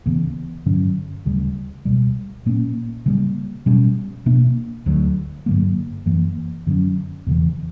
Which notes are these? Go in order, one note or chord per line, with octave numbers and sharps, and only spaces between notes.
C#2 C#3 E3 B3
G2 D3 F#3 C#4
D2 C#3 G3
C#2 B2 G3
A#2 A#3 C#4
C#3 G3 A#3
B2 G3 C#4
B2 A#3 D4
D2 D3 F#3
G2 D3 F#3 A#3
F#2 E3 A#3
F#2 D3 F#3 C#4
E2 C#3 E3